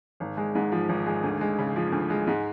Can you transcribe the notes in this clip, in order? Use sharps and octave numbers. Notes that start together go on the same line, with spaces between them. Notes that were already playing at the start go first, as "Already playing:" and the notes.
G#1
G#3
G#2
F3
G#1
G#3
D2
G#3
C#3
F3
D2
G#3
G#2